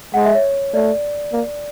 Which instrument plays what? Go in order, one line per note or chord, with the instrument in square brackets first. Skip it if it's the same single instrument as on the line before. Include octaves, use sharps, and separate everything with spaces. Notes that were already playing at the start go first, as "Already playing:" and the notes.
[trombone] G#3 [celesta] F#5
[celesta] E5
C#5
[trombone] A3 [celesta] D5
[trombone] A#3